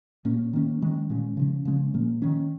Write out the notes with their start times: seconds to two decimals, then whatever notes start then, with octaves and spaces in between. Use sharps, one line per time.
0.25 A#2 A#3 C#4
0.53 D#3 A#3 C#4
0.82 D#3 G#3 C#4
1.10 A#2 G#3 C#4
1.37 C#3 F3 C#4
1.65 C#3 G#3 C#4
1.94 A#2 F3 A#3
2.22 D#3 C#4